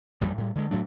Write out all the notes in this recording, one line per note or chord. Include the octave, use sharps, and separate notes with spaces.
A1 F2 G3
A2 G3
D3 G#3
A2 F#3 A3 D4